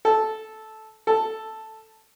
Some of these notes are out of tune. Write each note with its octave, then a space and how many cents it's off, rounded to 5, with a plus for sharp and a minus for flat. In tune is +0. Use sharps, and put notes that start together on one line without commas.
A4 -10
A4 +0